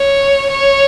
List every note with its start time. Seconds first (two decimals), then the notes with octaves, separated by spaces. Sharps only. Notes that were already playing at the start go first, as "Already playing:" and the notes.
Already playing: C#5
0.50 C#5